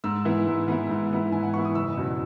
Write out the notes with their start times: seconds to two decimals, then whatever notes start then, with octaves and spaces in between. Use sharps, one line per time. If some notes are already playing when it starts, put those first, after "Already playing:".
0.04 G#2 E6
0.25 E3 B3 E4
0.47 G#2
0.68 E3 B3 E4
0.89 G#2
1.11 E3 B3 E4
1.32 G#2 G#5
1.43 F#5
1.54 E3 B3 E4 C#6
1.65 D#6
1.75 F#1 E6
1.97 E2 B2 F#3 C#4